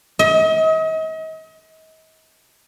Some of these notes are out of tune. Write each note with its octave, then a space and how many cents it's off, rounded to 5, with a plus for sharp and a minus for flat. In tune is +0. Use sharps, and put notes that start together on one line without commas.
D#5 +40